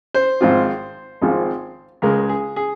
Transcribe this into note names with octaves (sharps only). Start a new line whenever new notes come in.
C5
G#1 G#2 F3 C4 F4
G#1 G#2 F3 C4 F4
C#2 C#3 G#3 A#4
G#4
G#4